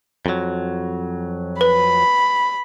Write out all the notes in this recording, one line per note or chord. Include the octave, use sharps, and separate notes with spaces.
F2 F#3
B4 B5